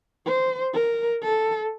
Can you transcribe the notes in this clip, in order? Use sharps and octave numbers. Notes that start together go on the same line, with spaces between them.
C5
A#4
A4